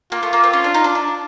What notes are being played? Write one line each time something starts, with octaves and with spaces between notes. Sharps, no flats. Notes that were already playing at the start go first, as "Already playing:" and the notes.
A#3 F4
A3
A#3
C4
C#4
D4
D#4
D4
D4